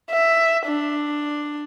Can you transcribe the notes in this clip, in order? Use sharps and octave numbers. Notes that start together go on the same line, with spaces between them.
E5
D4